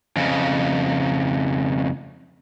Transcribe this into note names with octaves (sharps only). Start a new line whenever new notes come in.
F2 C#3